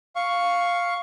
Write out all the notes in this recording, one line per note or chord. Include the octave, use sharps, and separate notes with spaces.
F5 C#6